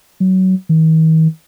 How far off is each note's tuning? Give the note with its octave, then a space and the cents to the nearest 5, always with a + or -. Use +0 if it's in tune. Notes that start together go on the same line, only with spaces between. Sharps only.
F#3 +20
D#3 +45